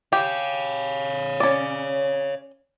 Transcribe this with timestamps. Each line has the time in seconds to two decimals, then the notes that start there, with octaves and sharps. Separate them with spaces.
0.13 G4 C#5 F5
1.40 C#4 D5